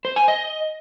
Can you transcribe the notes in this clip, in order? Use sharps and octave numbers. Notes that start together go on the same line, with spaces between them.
C5
G#5
D#5